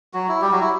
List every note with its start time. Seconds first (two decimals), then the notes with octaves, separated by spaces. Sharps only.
0.13 F#3 F#4
0.28 E4
0.42 G3 G4
0.51 F#3 F#4
0.61 E4